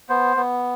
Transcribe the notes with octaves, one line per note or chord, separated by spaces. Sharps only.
B3 C5
B3